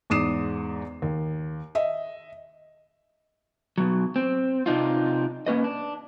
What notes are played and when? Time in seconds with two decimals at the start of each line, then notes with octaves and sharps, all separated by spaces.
0.10 E2 G#2 D6 D#6 C7 E7
1.02 D#2
1.75 D#5 E5
3.78 B2 F#3
4.16 C4
4.66 C3 D4 D#4 F4
5.46 A#3 C#4 B4 D#5
5.64 D4